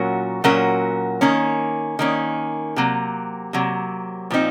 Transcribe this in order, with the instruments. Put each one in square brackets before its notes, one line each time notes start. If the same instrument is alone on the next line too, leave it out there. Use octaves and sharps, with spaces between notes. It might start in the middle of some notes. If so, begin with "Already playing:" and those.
Already playing: [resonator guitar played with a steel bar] A#2 F#3 C#4 F#4 A#4
A#2 F#3 C#4 F#4 A#4
D#3 A#3 C#4
D#3 A#3 C#4
C3 F#3 A#3
C3 F#3 A#3
A#2 F3 C4 D#4